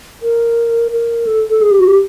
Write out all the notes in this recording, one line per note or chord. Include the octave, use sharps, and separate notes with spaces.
A#4
A#4
A4
A4
G#4
G4
F#4
G4